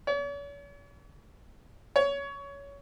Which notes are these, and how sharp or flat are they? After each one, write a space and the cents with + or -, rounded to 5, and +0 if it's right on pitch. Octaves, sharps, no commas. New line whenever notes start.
C#5 +45
C#5 +20